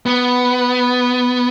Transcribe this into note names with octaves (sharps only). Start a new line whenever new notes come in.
B3